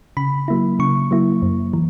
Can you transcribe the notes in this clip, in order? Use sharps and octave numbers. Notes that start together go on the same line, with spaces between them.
C#3 B5
F#3 A#3 E4
C#3 C#6
F#3 A#3 E4
F#2
E3